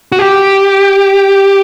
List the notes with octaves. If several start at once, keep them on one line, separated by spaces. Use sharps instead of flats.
F#4
G4